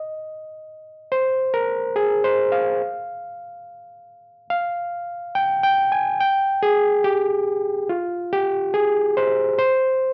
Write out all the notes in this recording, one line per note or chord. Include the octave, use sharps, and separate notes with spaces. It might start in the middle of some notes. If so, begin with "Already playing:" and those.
Already playing: D#5
C5
A#4
G#4
C5
F5
F5
G5
G5
G#5
G5
G#4
G4
F4
G4
G#4
C5
C5